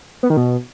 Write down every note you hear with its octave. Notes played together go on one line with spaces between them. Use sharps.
B3
D#3
B2